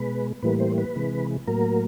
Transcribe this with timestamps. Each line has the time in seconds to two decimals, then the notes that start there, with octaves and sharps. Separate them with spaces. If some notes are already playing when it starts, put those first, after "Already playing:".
Already playing: B2 G#3 B4
0.42 A2 E3 G3 A#3 B4
0.60 C5
0.78 B4
0.95 C3 E3 G#3
1.47 A2 F#3 A#3 A#4